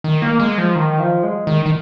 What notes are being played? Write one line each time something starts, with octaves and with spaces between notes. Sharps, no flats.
D#3
A#3
G#3
F3
D#3
F3
G#3
D#3
D#3